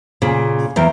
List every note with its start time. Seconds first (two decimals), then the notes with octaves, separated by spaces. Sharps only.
0.22 A#2 C#3
0.76 E2 A#3 G5